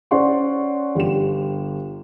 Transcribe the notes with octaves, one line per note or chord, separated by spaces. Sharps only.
C#4 C5 D5 F#5 C6 C#6
G1 G4 E7